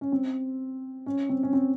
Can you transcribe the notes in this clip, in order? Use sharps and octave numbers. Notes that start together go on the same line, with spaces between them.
C#4
C4
C#4
C4
C#4
C4